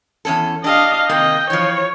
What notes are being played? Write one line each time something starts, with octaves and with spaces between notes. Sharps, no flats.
E2 C#4 A4
D4 G4 D#5 F5
C3 D#3 A#3 D#5 G5
E3 F3 C#5